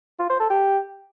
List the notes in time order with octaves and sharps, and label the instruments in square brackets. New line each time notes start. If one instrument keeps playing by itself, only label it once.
[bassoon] F4
C5
A4
G4